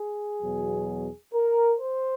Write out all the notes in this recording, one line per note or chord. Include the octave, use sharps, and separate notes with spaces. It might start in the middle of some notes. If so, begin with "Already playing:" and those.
Already playing: G#4
E2 B2 F#3
A#4
C5